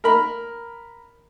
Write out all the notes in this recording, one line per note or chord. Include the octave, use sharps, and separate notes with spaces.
A#4 B5